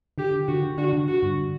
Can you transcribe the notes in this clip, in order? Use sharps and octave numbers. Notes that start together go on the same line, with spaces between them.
D3 G4
D3
D3 F#4
D3
D4 F#4
D3
D3 F#4
G2